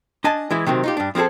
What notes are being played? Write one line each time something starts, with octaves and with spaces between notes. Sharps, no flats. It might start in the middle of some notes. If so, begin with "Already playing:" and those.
D4 D#5 G#5 A5
E3 G#3 E4
C3 D#3 F#3 C4
D#4 F4 G4
G2 D4
F3 C4 E4 G#4 A4